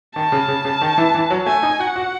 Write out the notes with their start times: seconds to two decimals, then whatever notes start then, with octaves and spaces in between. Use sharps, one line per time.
0.15 D#3 A5
0.32 C#3
0.48 C#3
0.65 C#3
0.82 D#3
0.98 E3
1.15 E3
1.30 F#3
1.46 A3 G#5
1.63 D#4
1.79 F#4 F#5
1.96 F#4